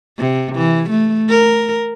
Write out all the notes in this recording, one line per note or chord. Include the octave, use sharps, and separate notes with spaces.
C3
E3
A3
A#4